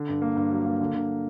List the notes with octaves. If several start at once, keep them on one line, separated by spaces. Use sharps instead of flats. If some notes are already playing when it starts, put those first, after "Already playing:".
Already playing: D3
G2
A#3
G2
F#3
A#3
D3
D3